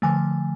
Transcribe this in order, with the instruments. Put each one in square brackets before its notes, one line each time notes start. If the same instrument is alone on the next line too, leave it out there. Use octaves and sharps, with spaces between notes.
[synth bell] D3 F3 A3 G#5